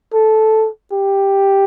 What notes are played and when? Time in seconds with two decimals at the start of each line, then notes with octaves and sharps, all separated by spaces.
0.13 A4
0.92 G4